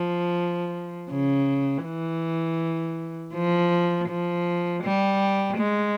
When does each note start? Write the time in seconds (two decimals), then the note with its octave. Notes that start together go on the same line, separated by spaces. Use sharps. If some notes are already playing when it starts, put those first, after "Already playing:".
Already playing: F3
1.11 C#3
1.84 E3
3.34 F3
4.09 F3
4.83 G3
5.57 G#3